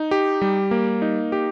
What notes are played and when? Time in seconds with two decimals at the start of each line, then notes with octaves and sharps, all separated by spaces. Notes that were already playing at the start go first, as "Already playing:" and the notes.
Already playing: D#4
0.11 G4
0.42 G3
0.71 A#3
1.02 D#4
1.32 G4